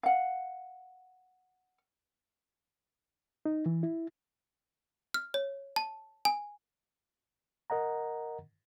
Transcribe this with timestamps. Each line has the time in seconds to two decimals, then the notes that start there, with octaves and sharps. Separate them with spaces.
0.03 F5 F#5
3.46 D#4
3.66 E3
3.83 E4
5.14 F6
5.34 C#5
5.76 A5
6.25 G#5
7.70 A#4 D#5 F#5 A#5